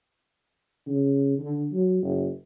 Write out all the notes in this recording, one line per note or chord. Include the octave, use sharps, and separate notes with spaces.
C#3
D3
F#3
F#1